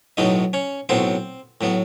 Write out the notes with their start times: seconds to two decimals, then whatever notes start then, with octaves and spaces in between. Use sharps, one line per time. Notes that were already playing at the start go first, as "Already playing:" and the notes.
0.17 B1 A2 F#3 B3 D#4 D#5
0.53 C#4 C#5
0.89 B1 A2 F#3 B3 C4 C5
1.61 A2 F#3 B3